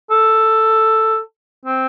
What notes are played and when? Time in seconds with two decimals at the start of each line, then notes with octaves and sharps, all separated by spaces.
0.11 A4
1.65 C4